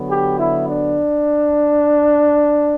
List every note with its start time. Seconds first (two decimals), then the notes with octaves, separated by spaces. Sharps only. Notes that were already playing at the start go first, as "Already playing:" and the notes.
Already playing: D3 F#3 B3
0.10 G4
0.38 E4
0.67 D4